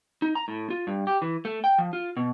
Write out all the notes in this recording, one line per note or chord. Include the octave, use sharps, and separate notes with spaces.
D#4
A#5
A2
F4
G2
G4
E3
A3
G5
F3
F4
B2